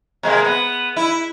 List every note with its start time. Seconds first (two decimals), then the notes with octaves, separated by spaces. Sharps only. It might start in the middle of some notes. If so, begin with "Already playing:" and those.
0.23 C3 G#3 A#3
0.45 B3
0.96 E4